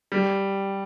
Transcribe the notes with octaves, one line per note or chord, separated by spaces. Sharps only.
G3